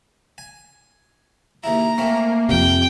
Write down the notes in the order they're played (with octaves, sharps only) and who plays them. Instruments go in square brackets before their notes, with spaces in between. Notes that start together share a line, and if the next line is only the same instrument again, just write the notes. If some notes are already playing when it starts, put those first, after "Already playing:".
[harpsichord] G#5
[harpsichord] D#2 C#3 E4 [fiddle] A#5
[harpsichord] A3 C4 C#4 [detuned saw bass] A#3
[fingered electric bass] F2 C3 [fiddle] G5